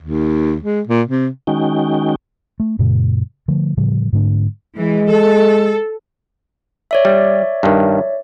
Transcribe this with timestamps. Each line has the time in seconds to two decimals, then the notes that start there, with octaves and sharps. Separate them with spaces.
0.02 D#2
0.63 G#3
0.87 A#2
1.07 C3
1.47 D#3 G#3 C#4 D#4 F#4 G5
2.60 A3
2.79 F#2 A#2 C#3 G#3
3.48 D3 F3 A3
3.77 A2 C#3 F3 G3
4.13 G#2 D3 A3 D4
4.78 E3 G#3
5.10 A4
6.91 C#5 D5 E5
7.05 G3
7.63 G2 D#3